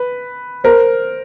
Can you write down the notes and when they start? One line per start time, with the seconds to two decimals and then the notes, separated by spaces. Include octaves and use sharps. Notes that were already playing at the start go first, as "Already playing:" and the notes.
Already playing: B4
0.64 A#4 C5